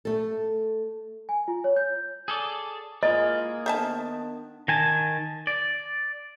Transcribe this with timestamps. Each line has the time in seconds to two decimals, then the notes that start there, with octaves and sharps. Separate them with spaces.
0.05 A3 A4
1.29 G#5
1.48 F4
1.64 C#5
1.76 G6
2.28 G#4 A4 D5
3.03 G#3 A#3 E4 F4 G#4 A#4 D#5
3.66 D#3 B3 D4 C5 E5 A5
4.68 D#3 G#5 A5
5.47 D5